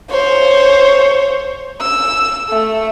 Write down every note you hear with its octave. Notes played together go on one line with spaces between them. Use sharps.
C5 C#5
E6
A3